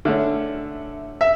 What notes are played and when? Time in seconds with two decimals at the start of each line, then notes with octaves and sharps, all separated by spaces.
0.05 D3 A3 C#4 E5
1.21 E5